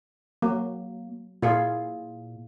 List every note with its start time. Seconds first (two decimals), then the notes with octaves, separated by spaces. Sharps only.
0.42 F#3 A#3
1.42 A#2 E4 F4 G#4